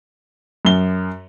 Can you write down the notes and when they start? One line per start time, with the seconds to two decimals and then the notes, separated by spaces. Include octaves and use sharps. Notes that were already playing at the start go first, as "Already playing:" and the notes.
0.65 F#2 G7